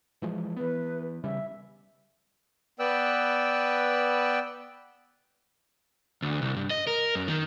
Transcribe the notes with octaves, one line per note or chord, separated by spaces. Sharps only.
E3 F3 G#3
E3 B3 B4
C#3 G3 C#4 E5
B3 B4 D5 G5 E6 F#6
D2
C2
G2
D#5
A#4
F#2
D#3